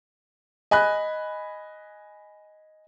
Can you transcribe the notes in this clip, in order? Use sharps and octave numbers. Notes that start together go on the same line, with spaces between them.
D#5 G#5 B5 F#6